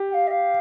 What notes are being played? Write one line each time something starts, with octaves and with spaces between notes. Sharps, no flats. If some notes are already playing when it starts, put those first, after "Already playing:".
Already playing: G4
G5
F5
D#5
F5